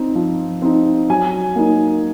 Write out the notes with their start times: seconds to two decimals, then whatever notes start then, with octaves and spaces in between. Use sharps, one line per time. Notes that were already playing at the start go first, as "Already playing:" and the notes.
Already playing: C4 D#4
0.15 F3
0.62 C4 D#4
1.10 F#3 G#5
1.56 A#3 D#4